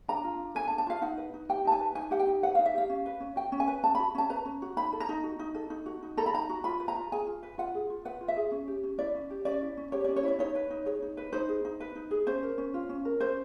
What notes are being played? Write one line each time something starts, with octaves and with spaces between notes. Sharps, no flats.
D4 A#5
F4
D4
A4 G#5
A5
D4
A5
F4 F5
D#4 F#5
B4
D#4
G4 G5
D#4 A5
G#5
B4
D#4 G#5
G4 F#5
G5
D#4
B4 F#5
D#4 F5
E5
G4 F5
C#4
B4
C#4
F#4 G5
C#4
G#5
B4
C#4 A5
F#4 B5
C#4 A5
B4 A#5
C#4
F#4
D#4 B5
A4
A#5
D#4
F#4
D#4
A4
D#4
F#4
D#4
A4 A#5
B5
D#4 A#5
F#4
F4 B5
B4
A#5
F4
G#4 G#5
F4
B4
F4 F#5
G#4
F4
B4 F#5
F4
E5
G#4
C#4
G4
C#4
E4 D5
C#4
G4
C#4 D5
E4
C#4
G4 C#5
C#4 D5
C#5
E4 D5
D#4 C#5
B4
D#4
G#4 C#5
D#4
B4
D#4 C5
G#4
D#4
B4
D#4
G#4
C#4 C5
A#4
C#4
F4
C#4
A#4
C#4 C5